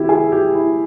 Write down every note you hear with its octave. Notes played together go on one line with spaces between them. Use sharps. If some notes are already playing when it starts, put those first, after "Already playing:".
Already playing: D#3 B3 E4 G4
G#4
G4
E4